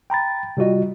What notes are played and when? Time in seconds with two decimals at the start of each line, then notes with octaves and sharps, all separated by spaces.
0.10 G5 A#5 B5 A6
0.57 C3 G3 F4 F#4 D#5